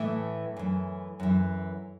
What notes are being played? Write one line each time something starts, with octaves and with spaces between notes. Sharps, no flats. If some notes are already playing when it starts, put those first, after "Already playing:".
Already playing: A2 E3 A3
F#2 E3
F#2 E3